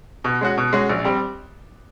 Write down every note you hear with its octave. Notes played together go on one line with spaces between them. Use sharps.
B2
G#3 C#4 F#4
B2
G#3 C#4 F#4
A#1
G3 C4